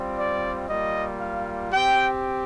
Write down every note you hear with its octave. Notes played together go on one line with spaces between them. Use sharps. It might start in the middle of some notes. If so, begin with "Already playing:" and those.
Already playing: G3 C4 F4
D5
G3 A#3 F4 D#5
F5
C4 G4 G5